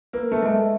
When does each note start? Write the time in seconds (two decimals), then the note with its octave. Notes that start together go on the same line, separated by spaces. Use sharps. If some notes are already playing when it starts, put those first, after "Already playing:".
0.13 A#3 B4
0.32 A3
0.42 G#3 E5 A5